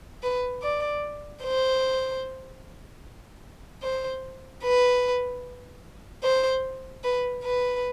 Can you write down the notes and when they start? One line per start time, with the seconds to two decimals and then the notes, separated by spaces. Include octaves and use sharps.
0.23 B4
0.63 D5
1.43 C5
3.83 C5
4.63 B4
6.24 C5
7.04 B4
7.44 B4